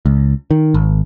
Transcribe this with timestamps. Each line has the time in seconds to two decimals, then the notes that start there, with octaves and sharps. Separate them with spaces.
0.06 C#2
0.51 D#3
0.74 G#1